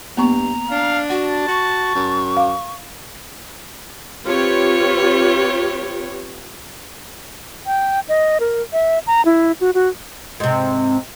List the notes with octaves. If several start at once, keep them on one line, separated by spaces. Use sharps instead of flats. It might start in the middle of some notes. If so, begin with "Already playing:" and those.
G2 A#3 B3 A#5 C#6
D4 F5
F#4 F#5 A5
F#4 C#6
F#2
F5 D6
C4 F4 G4 B4 C#5
G5
D#5
A#4
E5
A#5
E4
F#4
F#4
G#2 C3